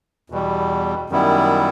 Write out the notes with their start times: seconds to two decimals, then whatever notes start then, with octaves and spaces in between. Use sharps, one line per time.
0.30 E2 B2 G3
1.10 F#2 D#3 G3 B3 E4